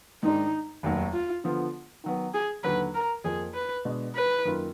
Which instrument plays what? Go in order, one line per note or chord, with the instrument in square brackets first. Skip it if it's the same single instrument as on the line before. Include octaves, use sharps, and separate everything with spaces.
[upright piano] G#2 D#3 G#3 D4 [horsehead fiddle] D#4
[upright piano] F1 D#2 D#3 F#3
[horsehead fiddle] F4
[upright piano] D3 F3 B3 F4
D#3 F#3 B3
[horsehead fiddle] G#4
[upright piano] D#2 D3 F#3 [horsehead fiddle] B4
[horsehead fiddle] A#4
[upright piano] F2 F3 A#3 [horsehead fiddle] G#4
[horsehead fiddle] B4
[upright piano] B2 G#3 B3 D4
[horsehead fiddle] B4
[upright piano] F#2 D#3 A#3 F4